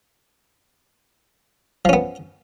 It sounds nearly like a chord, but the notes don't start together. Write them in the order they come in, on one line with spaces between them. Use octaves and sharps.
F3 C#4 B3